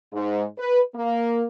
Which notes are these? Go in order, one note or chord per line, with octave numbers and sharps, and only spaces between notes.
G#2
B4
A#3